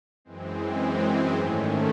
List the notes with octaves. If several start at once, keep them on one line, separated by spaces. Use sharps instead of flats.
F#2 E3 G#3 C4
G#2 D#3 A3 C#4